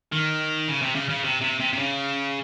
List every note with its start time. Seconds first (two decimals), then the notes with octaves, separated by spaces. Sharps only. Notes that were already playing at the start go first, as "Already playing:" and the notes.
0.12 D#3
0.68 C#3
0.82 C3
0.95 C#3
1.10 C#3
1.24 C3
1.42 C3
1.60 C3
1.73 C3
1.79 C#3